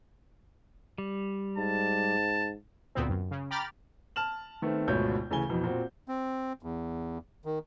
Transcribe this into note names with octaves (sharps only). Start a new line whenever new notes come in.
G3
G#2 A5
D2 A#2 B3 C4
F#2
C#3
G5 A#5 B5 D6 F6 A6
A5 F6 E7 F#7
D#3 A3 B3 C4
G#1 D2 B2 F4 C#5 G6
D2 C#3 E3 G#5 G7
F2 B2 E3
A#2 C4 F#4
C4
E2
D#3